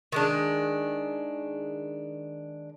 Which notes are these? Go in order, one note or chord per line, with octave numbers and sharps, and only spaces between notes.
D#3 G#3 D4